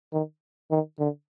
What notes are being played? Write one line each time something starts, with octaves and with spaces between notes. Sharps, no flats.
D#3
D#3
D3